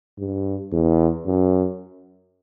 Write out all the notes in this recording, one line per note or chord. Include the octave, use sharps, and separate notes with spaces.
G2
E2
F#2